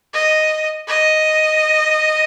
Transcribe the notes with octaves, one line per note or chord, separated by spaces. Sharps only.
D#5
D#5